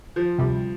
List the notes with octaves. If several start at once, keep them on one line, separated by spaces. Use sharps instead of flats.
F3
D2 C3 G3